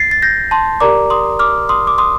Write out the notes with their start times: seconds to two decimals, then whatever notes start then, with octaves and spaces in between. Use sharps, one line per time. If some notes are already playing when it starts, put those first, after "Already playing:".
Already playing: A6 C7
0.11 A6
0.22 G6 A#6
0.51 A5 C6
0.80 G4 A#4 D5 A#5 D6
1.10 C6 D#6
1.39 D6 F6
1.69 C6 D#6
1.87 D6
1.98 C6 D#6